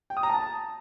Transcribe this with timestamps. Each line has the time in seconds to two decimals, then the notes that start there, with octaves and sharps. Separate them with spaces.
0.10 G5
0.17 D#6
0.23 A#5
0.30 A5